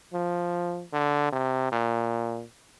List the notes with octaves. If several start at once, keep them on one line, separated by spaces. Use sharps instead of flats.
F3
D3
C3
A#2